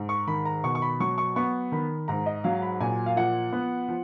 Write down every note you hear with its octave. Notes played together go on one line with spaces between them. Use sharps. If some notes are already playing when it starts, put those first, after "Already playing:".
Already playing: G#2
C#6
D#3 B5
A#5
B2 C#6
C#6
B5
F#3 C#6
C#6
B3 C#6
D#3 B5
G#2 A#5
D#5
F#3 F5
B5
A#2 G#5
F5
F3 F#5
B3
F3